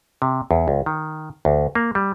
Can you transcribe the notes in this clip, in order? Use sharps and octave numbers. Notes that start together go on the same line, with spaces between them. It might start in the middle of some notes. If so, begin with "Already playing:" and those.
C3
E2
C#2
D#3
D2
A#3
G3